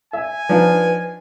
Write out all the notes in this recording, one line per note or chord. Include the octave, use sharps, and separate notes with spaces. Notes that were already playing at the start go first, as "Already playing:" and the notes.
E5 G#5
F3 D4 D#4 B4